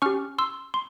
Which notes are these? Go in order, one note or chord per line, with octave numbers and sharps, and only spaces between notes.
C#4 G4 C#6 F6
C6 E6
C6